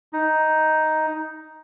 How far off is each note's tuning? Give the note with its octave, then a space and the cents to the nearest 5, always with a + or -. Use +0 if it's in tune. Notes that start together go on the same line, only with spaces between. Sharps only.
D#4 +5